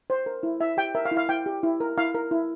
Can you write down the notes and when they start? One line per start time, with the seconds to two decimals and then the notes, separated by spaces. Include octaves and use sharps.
0.10 C5
0.26 A#4
0.43 E4
0.61 E4 E5
0.77 G4 G5
0.95 A#4 E5
1.05 F5
1.11 E4
1.17 F5
1.29 E4 G5
1.46 G4
1.63 E4
1.80 A#4
1.98 E4 F5
2.14 A#4
2.31 E4